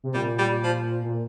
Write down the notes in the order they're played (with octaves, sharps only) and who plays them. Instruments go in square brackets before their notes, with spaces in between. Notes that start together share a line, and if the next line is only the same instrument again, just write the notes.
[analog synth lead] C3
[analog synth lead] A#2 [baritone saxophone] G3
[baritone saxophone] G3
F3
[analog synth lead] A#2